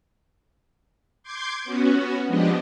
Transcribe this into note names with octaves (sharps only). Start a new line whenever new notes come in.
C6 D6 G6 G#6
B3 C#4 F#4
F3 G#3 B3 D4 G4 D#5